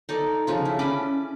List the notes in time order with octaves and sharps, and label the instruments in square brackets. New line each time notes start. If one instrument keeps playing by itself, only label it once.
[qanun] D#4 A4 D5
C#3 F3 F4
E4
[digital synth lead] C#4 [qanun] D4 B5 D6